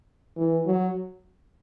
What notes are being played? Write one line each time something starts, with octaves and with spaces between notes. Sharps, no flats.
E3
F#3